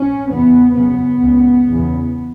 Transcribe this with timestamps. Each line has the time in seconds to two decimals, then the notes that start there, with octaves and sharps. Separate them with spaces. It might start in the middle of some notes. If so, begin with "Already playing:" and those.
Already playing: C#4
0.30 E2 C#3 B3
0.76 F#2 C#3 B3
1.22 C#2 C#3
1.68 E2 C#3